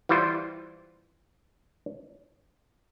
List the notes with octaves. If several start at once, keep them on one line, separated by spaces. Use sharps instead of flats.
E3 G3 E4 F4 C5